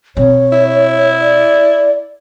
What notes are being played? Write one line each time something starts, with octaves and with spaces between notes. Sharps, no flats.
B2 C4 C#5
E4
D5